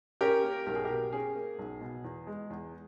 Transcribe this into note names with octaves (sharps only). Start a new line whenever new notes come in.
C#4 G4 A#4
A#3
B1 A#4
G#4
G4 A#4
B2
C#4 G#4
A#3
B1
B2
E2
G#3
E2